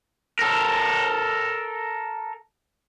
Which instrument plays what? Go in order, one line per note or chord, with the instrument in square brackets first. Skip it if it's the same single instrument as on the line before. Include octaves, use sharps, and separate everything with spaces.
[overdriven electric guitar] A4 A#4